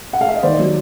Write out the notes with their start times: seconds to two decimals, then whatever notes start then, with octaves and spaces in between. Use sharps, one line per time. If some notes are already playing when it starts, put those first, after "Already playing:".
0.13 F#5
0.21 F5
0.28 E5
0.36 D#5
0.43 D#3 C5 D5
0.59 F#3